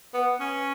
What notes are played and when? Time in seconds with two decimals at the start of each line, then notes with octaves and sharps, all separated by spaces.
0.14 B3
0.40 C#4